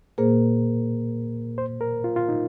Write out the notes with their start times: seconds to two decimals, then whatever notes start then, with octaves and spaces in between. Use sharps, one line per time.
0.18 A#2 A#3 G#4 A#4 C5
1.58 C5
1.81 A#4
2.04 F4
2.16 F4
2.29 D#4